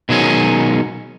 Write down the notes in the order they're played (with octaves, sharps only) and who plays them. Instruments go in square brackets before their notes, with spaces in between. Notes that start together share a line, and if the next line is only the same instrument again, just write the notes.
[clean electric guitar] B2 D#3 F#3 G#3 C#4